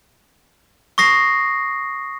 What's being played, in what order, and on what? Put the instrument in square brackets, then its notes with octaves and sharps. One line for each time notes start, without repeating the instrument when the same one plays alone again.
[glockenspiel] C#6 D#6 A#6 C7